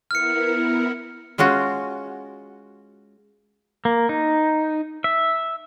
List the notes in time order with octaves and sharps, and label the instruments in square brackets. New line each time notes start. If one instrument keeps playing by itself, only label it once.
[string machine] B3 E4 A#4 [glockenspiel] F6 C#7
[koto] G#3 C#4 F4 F#4
[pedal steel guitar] A#3
D#4
E5